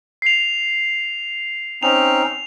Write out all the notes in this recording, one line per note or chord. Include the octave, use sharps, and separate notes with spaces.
C7 F7
C4 C#4 D#4 F7